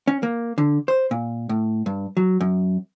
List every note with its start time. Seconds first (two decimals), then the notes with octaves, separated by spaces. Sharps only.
0.08 C#4
0.23 A#3
0.58 D3
0.88 C5
1.11 A#2
1.49 A2
1.86 G2
2.17 F#3
2.41 F#2